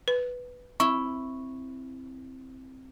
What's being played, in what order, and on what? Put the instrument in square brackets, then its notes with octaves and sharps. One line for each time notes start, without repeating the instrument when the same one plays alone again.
[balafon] B4
[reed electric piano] C4 [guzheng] E4 [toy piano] C#6